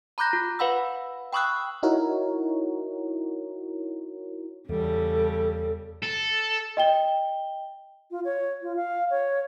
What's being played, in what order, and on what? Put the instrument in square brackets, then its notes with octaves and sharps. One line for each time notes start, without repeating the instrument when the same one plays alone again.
[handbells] A#5 B5 D6 F#6 G6 A#6
F4
B4 F5 F#5 B5 E6
G5 B5 C#6 D#6 E6 F#6
[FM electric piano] D#4 E4 F#4 A#4 C#5
[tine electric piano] E2 [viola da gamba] C#3 G3 [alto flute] A4
[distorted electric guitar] A4
[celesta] D#5 G5 G7
[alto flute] F4
C#5
F4
F5
C#5